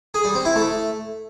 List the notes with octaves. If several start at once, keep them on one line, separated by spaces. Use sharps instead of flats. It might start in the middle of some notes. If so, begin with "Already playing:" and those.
G#4
G3
C4
E4
A3